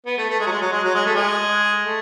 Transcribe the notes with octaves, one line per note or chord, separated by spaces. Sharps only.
B3
A3
A3
G#3
F#3
G#3
F#3
G#3
F#3
G#3
A3
G#3
A3